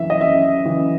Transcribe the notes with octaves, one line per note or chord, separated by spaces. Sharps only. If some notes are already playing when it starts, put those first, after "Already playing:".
Already playing: F#2 C#3 E3 E5
D#5
F#2 E5
C#3 E3